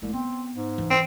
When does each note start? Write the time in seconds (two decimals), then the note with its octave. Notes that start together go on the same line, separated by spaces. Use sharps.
0.02 C2 G#3 A3
0.13 B3 C4
0.55 G#2
0.78 E3
0.91 C4